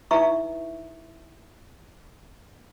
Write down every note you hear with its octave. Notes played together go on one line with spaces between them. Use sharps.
D#4 E4 B4 E5 A#5 C#6